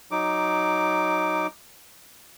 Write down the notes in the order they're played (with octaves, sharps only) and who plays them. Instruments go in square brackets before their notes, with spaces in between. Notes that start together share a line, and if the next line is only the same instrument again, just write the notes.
[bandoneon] F#3 D#4 D6